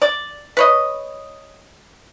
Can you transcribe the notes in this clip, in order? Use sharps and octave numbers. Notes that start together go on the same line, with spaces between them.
D5
B4 C#5 D#5